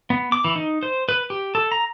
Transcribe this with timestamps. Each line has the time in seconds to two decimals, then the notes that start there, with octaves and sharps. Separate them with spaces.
0.10 B3
0.32 D6
0.44 E3
0.56 D#4
0.83 C5
1.09 B4
1.30 G4
1.55 A4
1.72 A#5